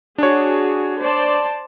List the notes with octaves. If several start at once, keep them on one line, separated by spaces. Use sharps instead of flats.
D4 F#4 G#4 C#5
C5 D5 A5